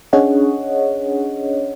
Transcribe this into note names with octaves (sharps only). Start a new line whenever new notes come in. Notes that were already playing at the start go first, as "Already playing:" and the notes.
C#4 D4 G#4 C#5 D#5 F#5